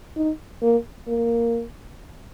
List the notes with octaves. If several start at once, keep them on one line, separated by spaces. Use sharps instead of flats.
D#4
A#3
A#3